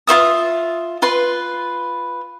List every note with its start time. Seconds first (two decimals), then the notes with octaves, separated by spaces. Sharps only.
0.07 F4 C5 E5 D#6
1.02 F4 B4 C6